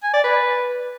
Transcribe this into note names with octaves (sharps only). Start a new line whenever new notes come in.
G#5
D5
B4